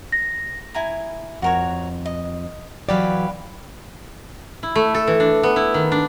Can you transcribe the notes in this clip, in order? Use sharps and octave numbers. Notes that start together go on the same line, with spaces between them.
A#6
E4 G#5 A#5
F2 F#4 A#4 C#5
D#5
E3 F#3 G4 B4 D5 F5
E4
A3
A4
E3
D4
B3
E4
D#3
D4